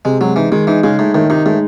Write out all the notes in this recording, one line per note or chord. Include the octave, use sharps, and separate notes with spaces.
C3 G#3
F#3 G#3
E3 D#4
D#3 G#3
E3 D#4
C#3 G#3
A2 D#4
A2 D#3
C3 D#4
A2 G#3